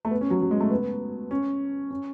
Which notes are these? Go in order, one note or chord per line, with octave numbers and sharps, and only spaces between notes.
A3
B3
C#4
F#3
F#3
G#3
A3
B3
C#4
C#4